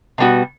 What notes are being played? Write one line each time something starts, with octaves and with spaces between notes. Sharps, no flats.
B2 G3 B3 F#4